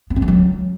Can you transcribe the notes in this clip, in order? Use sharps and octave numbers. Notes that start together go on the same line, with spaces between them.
B3
C#4
E3
F#3